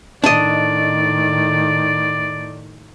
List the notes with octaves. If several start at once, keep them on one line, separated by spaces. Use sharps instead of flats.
A2 D#3 D4 D5 D#5